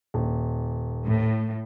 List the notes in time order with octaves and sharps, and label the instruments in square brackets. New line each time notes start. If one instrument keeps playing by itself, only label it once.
[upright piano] D#1
[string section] A2